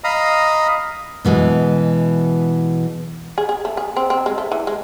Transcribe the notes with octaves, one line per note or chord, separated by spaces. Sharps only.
D#5 F5 A#5 B5 D#6
B2 E3 G#3
G#4
G#4
A3
G#4
C4
C4
G#3
A3
E3
G#3